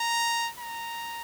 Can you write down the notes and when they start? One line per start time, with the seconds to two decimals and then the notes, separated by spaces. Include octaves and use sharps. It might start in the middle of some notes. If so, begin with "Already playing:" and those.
Already playing: A#5
0.59 A#5